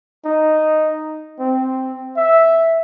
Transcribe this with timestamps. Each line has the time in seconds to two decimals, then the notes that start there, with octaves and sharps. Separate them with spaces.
0.25 D#4
1.40 C4
2.17 E5